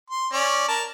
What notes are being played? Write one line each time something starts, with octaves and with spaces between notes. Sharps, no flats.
C6
C#4 D5
A#4 A5